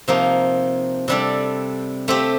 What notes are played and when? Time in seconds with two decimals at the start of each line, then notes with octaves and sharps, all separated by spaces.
0.08 C3 F3 A#3 D#4
1.08 C3 G3 D4 A4 D5
2.08 A3 C4 G4